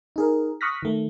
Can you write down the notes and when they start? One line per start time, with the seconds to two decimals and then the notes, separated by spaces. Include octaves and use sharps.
0.16 D#4 G#4 A#4
0.61 C#6 D#6 F6 F#6 A#6 B6
0.83 D#3 A3